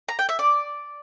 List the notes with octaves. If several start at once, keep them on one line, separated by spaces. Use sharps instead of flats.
A#5
G5
E5
D5